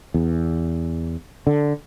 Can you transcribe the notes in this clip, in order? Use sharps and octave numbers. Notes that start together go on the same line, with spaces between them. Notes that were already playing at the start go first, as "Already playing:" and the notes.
E2
D3